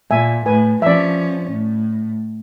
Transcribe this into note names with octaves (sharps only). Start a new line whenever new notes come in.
A#2 E5 G#5
A2 B4 G#5
F3 C#4 D5 E5
A2